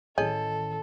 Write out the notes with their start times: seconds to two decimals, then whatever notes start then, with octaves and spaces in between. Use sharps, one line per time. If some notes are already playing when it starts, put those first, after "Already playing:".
0.18 A1 D#3 G#4 A4 C#5 D#5